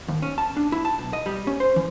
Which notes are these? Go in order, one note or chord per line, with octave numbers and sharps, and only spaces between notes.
D#2
C#4
A5
D4
E4
A5
B1
D#5
G3
C#4
C5
E3